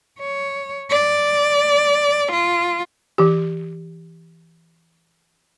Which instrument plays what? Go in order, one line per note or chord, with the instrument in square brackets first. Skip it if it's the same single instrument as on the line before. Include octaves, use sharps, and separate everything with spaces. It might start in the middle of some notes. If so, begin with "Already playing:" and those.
[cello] C#5
D5
F4
[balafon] E3 G4